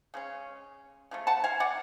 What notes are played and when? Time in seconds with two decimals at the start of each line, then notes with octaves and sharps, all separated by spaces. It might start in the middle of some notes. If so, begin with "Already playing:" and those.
0.14 C#3 G#3 C#4
1.11 C#3 F3 A3
1.27 F#5 A5
1.44 F5 G#5
1.60 D5 F#5